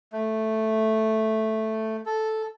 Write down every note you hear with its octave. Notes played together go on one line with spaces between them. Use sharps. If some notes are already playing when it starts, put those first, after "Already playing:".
A3
A4